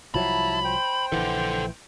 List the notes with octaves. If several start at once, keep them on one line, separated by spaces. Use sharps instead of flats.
C2 F3 F#3 E4 A5 B5
C5 G5
A#1 E3 A4 F#5